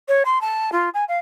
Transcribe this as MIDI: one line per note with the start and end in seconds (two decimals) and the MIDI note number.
0.08 0.23 73
0.25 0.41 84
0.41 0.70 81
0.72 0.89 65
0.94 1.04 80
1.08 1.18 77